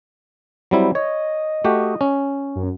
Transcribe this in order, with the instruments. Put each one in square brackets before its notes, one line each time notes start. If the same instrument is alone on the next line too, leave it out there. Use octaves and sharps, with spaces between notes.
[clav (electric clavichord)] F#3 G3 E4 [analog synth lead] C4
[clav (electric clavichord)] C#5 [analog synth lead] D#5
[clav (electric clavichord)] A3 F#4 G4
C#4
[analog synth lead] F#2